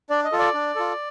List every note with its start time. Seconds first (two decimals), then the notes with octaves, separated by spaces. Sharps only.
0.10 D4 D5
0.24 D#5
0.32 F4 A4
0.39 D5
0.54 D4
0.75 F4 A4